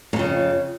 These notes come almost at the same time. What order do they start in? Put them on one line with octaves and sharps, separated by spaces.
G#2 F2 C#3